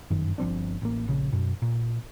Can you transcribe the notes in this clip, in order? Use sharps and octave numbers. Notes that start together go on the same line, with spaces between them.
G1 F#2 D#3
G1 F3 C4 D4
A1 A#3
A#1 C#3
F#2 B2
A#2